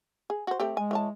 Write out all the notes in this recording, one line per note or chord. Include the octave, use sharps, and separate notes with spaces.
G#4
F#4 C5
A3 C4 G4
G#3 G#5
E3 C#5 A5